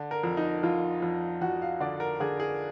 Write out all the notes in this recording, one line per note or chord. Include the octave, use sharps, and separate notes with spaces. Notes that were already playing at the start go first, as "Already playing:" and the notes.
Already playing: D3
A#4
F2
D#4
F2 F4
F2
F2 F#4
F5
D3 D5
A#4
D3 G#4
G#4